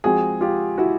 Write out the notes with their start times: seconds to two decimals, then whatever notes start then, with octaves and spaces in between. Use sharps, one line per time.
0.04 F3 G#3 C4 F#4 G#4
0.41 F4 G4
0.78 E4 F#4